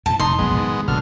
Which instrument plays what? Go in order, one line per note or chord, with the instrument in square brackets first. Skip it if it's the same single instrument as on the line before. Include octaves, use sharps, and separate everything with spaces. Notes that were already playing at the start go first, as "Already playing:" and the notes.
[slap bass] E2 G#2 [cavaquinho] A5
[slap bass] F1 F#2 [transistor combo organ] D#4 [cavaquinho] C6
[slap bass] F1 B1 F2 [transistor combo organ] G#3 B3
[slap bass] G#2 D#3
[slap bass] F#1 [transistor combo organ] B2 D3 F6